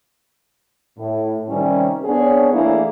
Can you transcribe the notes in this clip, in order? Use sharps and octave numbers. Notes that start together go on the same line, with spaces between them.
A2
C3 D#3 G3 C#4
B3 C4 D4 G#4 C#5
E3 A3 A#3 D4 E4 G#4